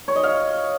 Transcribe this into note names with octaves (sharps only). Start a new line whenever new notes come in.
C#5
D#5
F5